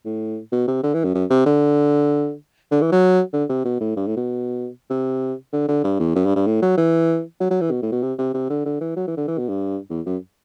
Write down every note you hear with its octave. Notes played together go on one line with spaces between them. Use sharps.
A2
B2
C3
D3
E3
F#2
F#2
C3
D3
D3
E3
F#3
D3
C3
B2
A2
G2
A2
B2
C3
D3
D3
G2
E2
F#2
G2
G2
A2
F#3
E3
F#3
F#3
E3
B2
A2
B2
C3
C3
C3
D3
D3
E3
F#3
E3
D3
E3
B2
G2
E2
F#2